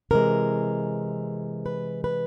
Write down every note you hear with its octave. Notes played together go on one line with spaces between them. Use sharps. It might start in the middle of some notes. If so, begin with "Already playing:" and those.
C3 E3 G#3 A#4
B4
B4